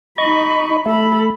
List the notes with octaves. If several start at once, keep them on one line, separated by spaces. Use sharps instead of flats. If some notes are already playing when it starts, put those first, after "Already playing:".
D#4 D#5 B5 C#6
A3 A4 B5